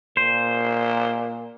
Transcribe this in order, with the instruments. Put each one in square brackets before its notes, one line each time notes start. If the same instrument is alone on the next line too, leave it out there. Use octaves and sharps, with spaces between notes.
[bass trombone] A#2 [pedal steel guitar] C5